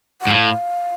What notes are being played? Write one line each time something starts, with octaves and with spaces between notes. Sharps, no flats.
F#5
G#2
A2 F5